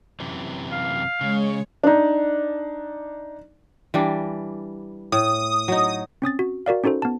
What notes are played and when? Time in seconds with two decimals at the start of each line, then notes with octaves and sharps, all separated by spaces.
0.20 F#2 C3 E3
0.72 F5
1.21 C#3 G#3 C#5
1.84 D4 D#4
3.94 E3 G3 D4
5.12 A2 D#6
5.68 F#3 D#4
6.22 C4 C#4 D#6 A6
6.39 F#4
6.66 F#4 A#4 D5 F5
6.84 C#4 D#4 F#4 A4 C5
7.02 B3 A5